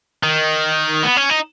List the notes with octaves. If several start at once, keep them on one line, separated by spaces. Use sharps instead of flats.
D#3
B3
C#4
D#4